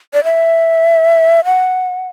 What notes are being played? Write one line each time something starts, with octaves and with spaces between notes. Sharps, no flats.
D5
E5
F#5